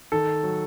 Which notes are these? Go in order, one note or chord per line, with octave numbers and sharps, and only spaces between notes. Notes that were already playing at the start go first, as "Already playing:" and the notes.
D#3 A4
F#3